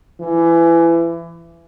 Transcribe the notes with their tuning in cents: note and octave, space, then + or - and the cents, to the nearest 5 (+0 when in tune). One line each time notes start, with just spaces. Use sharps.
E3 +25